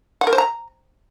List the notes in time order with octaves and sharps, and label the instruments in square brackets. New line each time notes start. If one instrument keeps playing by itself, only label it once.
[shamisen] F#5
A#4
C5
A#5